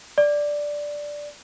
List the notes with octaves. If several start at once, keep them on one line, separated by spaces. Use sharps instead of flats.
D5